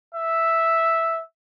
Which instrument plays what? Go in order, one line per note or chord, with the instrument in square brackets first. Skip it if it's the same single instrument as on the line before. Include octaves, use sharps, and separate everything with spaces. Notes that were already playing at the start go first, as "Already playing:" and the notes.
[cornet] E5